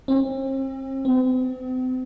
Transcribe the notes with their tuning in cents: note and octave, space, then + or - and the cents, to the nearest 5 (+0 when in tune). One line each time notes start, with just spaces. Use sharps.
C4 +45
C4 -40